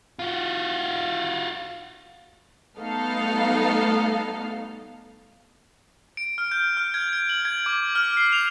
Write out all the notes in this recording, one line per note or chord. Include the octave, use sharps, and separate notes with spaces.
F4 F#4
G3 A3 B3 D#4 A4 F5
D7
F6
G6
F6
G#6
D7
F#7
G#6
D6
F6
C7
F7